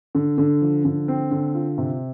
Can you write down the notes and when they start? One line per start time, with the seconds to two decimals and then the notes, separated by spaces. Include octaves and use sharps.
0.15 D3
0.38 D3
0.61 F3
0.85 D3
1.08 C4
1.31 D3
1.54 F4
1.78 C3